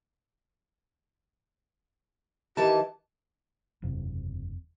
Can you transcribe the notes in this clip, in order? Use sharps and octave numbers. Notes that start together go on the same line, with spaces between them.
D#3 E3 G4 A5
F#1 E2 C3